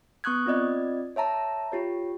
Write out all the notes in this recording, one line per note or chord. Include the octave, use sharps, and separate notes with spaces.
B3 C#6 D#6 F#6 G#6
C4 F4 D5 D#5 G#6
C#5 E5 A5 A#5
F4 G4 C#5